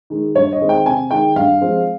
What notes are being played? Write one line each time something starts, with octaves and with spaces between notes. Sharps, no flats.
D#3 G#3
G2 C#5
D#5
D#3 G#3 C4
G5
C3 G#5
D#3 G#3 G5
G2 F5
F3 G#3 C4